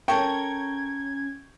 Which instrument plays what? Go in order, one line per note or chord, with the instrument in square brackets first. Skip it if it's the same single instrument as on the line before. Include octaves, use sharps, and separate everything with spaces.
[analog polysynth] C#4 G#6 [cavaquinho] A4 A#4 [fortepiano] G5 C#6